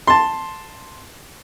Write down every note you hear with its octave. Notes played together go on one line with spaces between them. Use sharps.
A5 C6